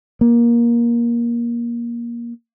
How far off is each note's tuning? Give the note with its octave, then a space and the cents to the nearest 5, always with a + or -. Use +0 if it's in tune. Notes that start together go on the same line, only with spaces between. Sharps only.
A#3 +20